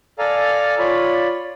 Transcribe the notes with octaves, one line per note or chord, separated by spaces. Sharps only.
A4 D5 F5 G#5 A#5
F4 C#5 D5 B5